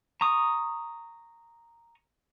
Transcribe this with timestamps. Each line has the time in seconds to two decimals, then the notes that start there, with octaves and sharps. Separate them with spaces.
0.21 A#5 C#6 D#6